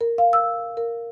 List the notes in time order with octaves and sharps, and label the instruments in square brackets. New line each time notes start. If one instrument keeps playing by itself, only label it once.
[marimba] A#4
F5
E6
A#4